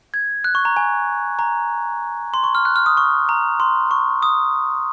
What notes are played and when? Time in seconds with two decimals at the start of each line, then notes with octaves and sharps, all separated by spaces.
0.14 G#6
0.44 F#6
0.55 C#6
0.65 A#5
0.77 G#5
1.39 A#5
2.34 C6
2.44 C#6
2.55 F6
2.65 F#6
2.76 F6
2.86 D#6
2.97 C#6
3.29 A#5
3.60 C6
3.91 C#6
4.22 D#6